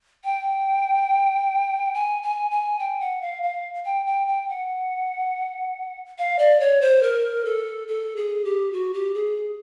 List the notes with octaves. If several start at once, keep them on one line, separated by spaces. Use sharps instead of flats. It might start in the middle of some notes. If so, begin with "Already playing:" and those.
G5
G#5
G#5
G#5
G5
F#5
F5
F5
G5
G5
G5
F#5
F5
D5
C#5
C5
A#4
A4
A4
G#4
G4
F#4
G4
G#4